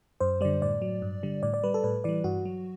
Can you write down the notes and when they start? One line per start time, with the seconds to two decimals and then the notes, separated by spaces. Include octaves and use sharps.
0.20 F#2 C5
0.41 D3 G3 D5
0.62 A2 D5
0.82 F#3
1.02 G2
1.23 D3 G3
1.43 A2 D5
1.54 D5
1.63 G3 B4
1.74 A4
1.84 A2 B4
2.04 E3 G3 D5
2.24 G2 F#4
2.45 F#3